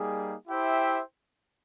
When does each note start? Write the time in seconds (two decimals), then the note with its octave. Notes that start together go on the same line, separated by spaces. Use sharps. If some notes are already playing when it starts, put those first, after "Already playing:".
Already playing: G3 A#3 D#4 G#4
0.48 E4 G4 C5 E5 G5